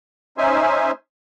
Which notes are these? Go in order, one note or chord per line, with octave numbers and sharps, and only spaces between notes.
C#4 D#4 C5 E5 G#5